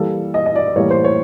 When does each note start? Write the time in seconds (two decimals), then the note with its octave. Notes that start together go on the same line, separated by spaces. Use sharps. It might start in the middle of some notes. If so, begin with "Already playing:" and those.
Already playing: E3 G3 A#3 A4
0.34 D#5
0.46 D#5
0.56 D5
0.76 A2 E3 G3 A#3 C#5
0.90 C5
1.04 C#5